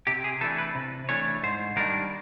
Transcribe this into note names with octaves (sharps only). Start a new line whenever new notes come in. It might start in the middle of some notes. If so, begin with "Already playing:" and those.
C3 G4
G#4
E3 A3 D4 A4
B4
C3
E3 A3 D4 C#5
G#2 C5
D#3 G3 A#3 D4 A#4